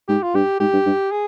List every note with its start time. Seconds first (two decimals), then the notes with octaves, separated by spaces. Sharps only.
0.08 G#2 G4
0.23 F4
0.34 G2 G4
0.60 G#2 G4
0.73 G2
0.86 G2
1.11 G#4